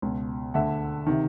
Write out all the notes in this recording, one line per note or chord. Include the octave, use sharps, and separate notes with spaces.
C#2 B2
D2 D3 E5 F#5
C3 D#3